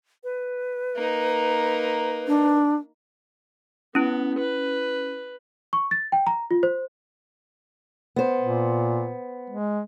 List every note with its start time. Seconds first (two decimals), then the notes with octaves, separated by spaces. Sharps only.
0.24 B4
0.96 A#3 D#4
2.27 D4
3.95 B3 C#4 E4
4.39 B4
5.73 C#6
5.91 A6
6.12 G5
6.27 A#5
6.51 F4
6.63 C5
8.16 B3 C5
8.41 A#2
9.50 G#3